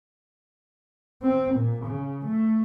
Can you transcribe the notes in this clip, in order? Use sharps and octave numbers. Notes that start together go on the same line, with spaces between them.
C4
A#2
C#3
A3